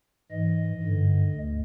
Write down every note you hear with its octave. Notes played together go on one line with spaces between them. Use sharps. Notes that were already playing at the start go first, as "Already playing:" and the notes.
G#2 E3 D#5
G2 D3
D2